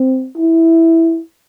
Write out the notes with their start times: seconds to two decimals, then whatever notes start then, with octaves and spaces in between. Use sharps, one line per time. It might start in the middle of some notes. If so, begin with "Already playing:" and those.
Already playing: C4
0.37 E4